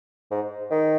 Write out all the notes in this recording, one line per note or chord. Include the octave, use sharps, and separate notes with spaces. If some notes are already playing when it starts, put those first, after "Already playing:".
G#2
D#3